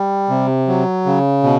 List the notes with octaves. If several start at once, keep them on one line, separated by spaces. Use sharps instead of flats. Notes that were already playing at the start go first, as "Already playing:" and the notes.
Already playing: G3
C3
F#3
C#3
B2